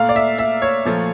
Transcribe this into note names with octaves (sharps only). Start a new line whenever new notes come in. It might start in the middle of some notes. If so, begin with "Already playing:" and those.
Already playing: A#2 A3 F5
D5
E5
E5
C#5
A#2 F3 A3